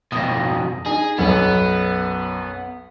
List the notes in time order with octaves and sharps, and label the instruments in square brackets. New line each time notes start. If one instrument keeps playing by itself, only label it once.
[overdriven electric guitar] F2 B2 [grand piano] D#6 A#6
[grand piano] D#4 [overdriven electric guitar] G#4
[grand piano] B1 F#2 [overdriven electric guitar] B3